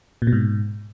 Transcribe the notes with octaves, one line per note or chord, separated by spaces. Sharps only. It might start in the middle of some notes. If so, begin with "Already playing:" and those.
A#2
B2
G#2